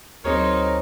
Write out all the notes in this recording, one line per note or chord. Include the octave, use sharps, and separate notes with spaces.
D2 F#3 C4 D#4 G#4 A#4 C#5